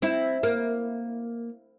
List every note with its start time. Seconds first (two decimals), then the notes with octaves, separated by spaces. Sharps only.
0.02 C4 E4
0.43 A#3